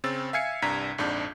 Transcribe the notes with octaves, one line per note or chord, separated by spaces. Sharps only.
C#3 C4 E6 A6
E5 F5 G#5 G#6 C7 C#7
C2 G2 D4 A#5 G#6 B6
A#1 F2 G#2 D4 G6